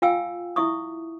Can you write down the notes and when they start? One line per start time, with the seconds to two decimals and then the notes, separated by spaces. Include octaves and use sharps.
0.02 F4 F5 G5 G#5 E6
0.56 E4 E5 C#6 D#6